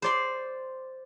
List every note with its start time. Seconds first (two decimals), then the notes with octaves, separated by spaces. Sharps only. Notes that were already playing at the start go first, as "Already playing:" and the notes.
0.02 C5 D5 C6